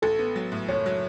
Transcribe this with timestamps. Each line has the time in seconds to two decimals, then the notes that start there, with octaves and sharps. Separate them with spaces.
0.02 A1 A4
0.19 B3
0.36 F#3
0.52 A2
0.68 F#1 C#5
0.86 F#3